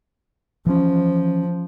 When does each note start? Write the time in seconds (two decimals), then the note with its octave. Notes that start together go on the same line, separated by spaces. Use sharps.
0.66 E3 F3 C#4